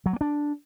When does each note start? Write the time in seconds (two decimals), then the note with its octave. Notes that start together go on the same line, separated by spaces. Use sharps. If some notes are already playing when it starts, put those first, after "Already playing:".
0.06 F#3
0.13 A#3
0.21 D4